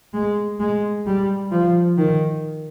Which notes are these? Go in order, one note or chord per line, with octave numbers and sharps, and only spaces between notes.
G#3
G#3
G3
F3
D#3